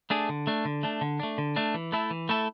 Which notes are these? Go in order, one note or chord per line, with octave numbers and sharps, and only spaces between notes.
A3 D4 G#4
D3
A3 D4
D3
A3 D4
D3
A3 D4
D3
A3 D4
E3
A3 E4 A4
E3
A3 E4 A4